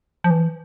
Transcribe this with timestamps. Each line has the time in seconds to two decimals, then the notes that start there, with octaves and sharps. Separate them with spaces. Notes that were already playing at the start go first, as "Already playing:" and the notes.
0.24 F3
0.30 E3